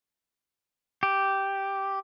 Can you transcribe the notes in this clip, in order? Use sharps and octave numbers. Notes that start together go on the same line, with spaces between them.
G4